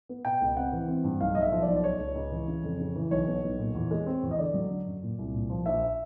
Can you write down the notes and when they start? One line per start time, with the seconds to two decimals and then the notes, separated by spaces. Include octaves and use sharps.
0.09 B3
0.25 B2 G5
0.41 C#2
0.57 C4 F#5
0.73 E3
0.88 C4
1.04 G2
1.21 B1 F5
1.35 B1 D#5
1.42 E5
1.52 F3
1.62 D5
1.68 B1
1.76 D5
1.84 C#2 C#5
1.99 C#2
2.15 C#2
2.32 E3
2.48 C#3
2.63 F2
2.80 C#3
2.96 E3
3.11 B1 C#5
3.27 B3
3.44 B1
3.59 A#2
3.75 E2
3.91 G#3
4.07 C4
4.23 E2
4.31 D#5
4.39 D3 D5
4.54 F#3
4.70 D3
4.86 F#2
5.03 A#2
5.19 C2
5.34 A#2
5.50 F3
5.66 A#1 E5